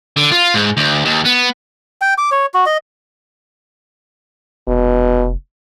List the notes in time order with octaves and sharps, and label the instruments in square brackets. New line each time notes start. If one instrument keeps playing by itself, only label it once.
[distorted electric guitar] D3
F4
G#2
D2
D#2
B3
[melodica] G5
D6
C#5
F#4
D#5
[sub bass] F1 [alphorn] B2